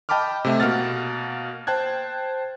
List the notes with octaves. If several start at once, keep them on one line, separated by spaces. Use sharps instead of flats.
D#5 G5 A5 B5 D6 F6
C3 A3 E5
B2 A#3 F#5 F6 A6
C5 G5 A5 F#6 G#6